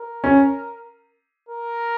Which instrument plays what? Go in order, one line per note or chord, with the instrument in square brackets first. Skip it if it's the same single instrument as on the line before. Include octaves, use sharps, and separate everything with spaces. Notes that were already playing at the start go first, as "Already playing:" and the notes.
Already playing: [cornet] A#4
[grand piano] C#4
[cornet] A#4